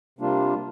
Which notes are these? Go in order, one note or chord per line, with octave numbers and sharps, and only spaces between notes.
C3 G3 A#3 D4 F4